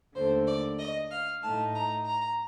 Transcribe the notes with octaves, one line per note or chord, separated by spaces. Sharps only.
D#2 D3 A3 C5
D5
D#5
F5
A2 A3 D#4 A5
A#5
A#5